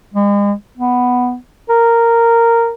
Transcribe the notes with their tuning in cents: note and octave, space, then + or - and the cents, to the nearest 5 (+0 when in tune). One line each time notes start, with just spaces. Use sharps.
G#3 -40
B3 +5
A#4 -10